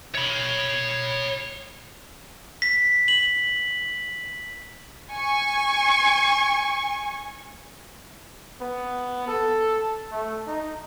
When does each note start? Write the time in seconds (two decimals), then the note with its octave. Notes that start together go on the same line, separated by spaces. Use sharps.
0.15 C#5 B5
2.62 B6
3.08 F#7
5.13 G#5 C#6
8.61 B3
9.28 A4
10.11 A3
10.47 D#4